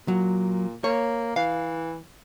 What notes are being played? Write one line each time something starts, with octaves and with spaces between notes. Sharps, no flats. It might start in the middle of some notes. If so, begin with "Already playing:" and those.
A#2 F#3
A#3 C#5
E3 F5